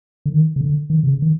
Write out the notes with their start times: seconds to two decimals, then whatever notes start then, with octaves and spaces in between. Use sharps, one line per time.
0.26 D3
0.32 D#3
0.56 C#3
0.61 D3
0.90 D#3
1.03 C3
1.09 C#3
1.22 D#3